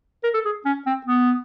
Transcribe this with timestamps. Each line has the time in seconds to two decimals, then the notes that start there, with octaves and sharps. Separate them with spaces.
0.24 A#4
0.34 A4
0.45 G#4
0.65 C#4
0.86 C4
1.06 B3